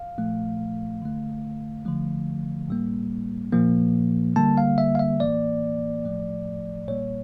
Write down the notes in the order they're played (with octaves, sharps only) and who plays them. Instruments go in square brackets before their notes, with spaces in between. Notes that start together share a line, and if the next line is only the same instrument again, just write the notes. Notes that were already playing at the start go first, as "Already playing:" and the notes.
Already playing: [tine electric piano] F5
A#2 F3 A3
D3 A3
D3 F3 A3
A2 G3 A#3
A#2 F3 A#3
D3 G3 A#3 A5
F5
E5
F5
E5
A2 E3 A#3 D5
A2 F3 A3
A#2 G3 A#3 C#5